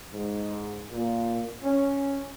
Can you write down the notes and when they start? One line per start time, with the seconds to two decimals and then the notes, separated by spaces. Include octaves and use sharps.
0.13 G#2
0.91 A#2
1.63 C#4